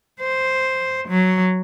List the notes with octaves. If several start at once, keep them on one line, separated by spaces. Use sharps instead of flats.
C5
F#3